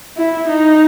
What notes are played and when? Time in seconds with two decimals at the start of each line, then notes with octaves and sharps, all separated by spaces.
0.17 E4
0.49 D#4